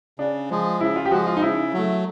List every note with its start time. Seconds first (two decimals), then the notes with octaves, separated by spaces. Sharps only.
0.19 C#3 D4
0.50 F3 G#3
0.81 C#3 E4
0.96 F4
1.05 G4
1.11 F3 G#3 F#4
1.27 F4
1.37 D#4
1.42 C#3 E4
1.73 F#3 A3